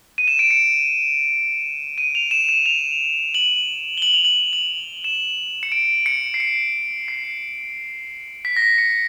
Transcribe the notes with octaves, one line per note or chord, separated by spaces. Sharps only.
D#7
E7
D7
C#7
D#7
F7
E7
E7
F7
F#7
G7
F#7
F7
F#7
F#7
E7
C#7
D7
C#7
C7
C#7
C7
B6
A#6
B6
C#7
C#7